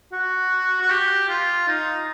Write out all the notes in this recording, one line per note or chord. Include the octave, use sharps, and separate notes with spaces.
F#4
F#4
G4
F4
D#4